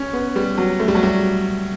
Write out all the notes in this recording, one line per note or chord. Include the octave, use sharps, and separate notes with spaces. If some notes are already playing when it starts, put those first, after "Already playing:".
Already playing: C#4
B3
G3
F#3
A3
G3
F#3
G3